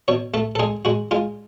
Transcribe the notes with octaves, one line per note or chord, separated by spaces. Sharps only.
B2 C#5
A3 A4
A4
G#3 G#4
G#3 F#4
G#3 F4